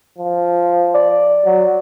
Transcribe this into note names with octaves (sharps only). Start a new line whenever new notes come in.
F3
D5
F#3